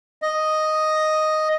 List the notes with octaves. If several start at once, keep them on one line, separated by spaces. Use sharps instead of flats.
D#5